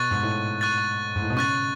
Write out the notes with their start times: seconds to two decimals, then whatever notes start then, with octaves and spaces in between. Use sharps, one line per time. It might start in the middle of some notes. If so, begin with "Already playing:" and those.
Already playing: B2 C#6 F#6 A6
0.11 G#2
0.23 A2
0.61 C#6 F#6 A6
1.16 G#2
1.22 A2
1.30 B2
1.36 C#3 C#6 F#6 A6